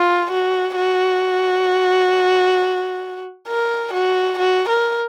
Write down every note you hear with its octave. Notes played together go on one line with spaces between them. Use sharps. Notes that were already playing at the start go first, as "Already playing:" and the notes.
Already playing: F4
F#4
F#4
A#4
F#4
F#4
A#4